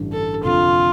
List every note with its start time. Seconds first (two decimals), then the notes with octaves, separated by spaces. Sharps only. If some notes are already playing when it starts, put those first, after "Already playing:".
Already playing: A1 G2 D3 A3 D4
0.12 A4
0.44 F1 F2 D3 A3 F4